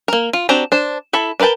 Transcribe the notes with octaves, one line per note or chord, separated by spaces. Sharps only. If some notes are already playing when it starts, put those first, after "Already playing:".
A#3 A#4
F4
C4 D4 F#4 G4 A#5
D4 C5
E4 A4 B5
D4 A#4 B4 G5 A5